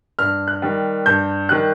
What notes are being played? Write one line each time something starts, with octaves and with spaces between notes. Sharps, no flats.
G2 F6
F#6
D#3 G3
G2 G6
D#3 G3 F#6